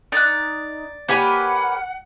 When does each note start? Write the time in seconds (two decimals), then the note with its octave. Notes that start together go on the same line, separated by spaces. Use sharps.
0.12 D#4 D5 F#6
1.08 A#3 G4 B4 C#5 F#5 G#5